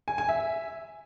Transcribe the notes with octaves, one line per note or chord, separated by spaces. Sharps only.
G#5
G#5
E5